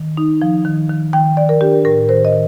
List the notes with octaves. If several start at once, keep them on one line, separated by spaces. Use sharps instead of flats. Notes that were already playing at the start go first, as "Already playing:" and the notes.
Already playing: D#3
D#4
F3
D#3
D#3
D#3 G5
D#3 D5
A#4
D4 G4
A2 A#4
D#3 C5
D#5
D#3